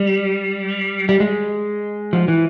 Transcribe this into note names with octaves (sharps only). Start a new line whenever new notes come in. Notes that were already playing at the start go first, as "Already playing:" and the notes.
Already playing: G3
G3
G#3
F3
E3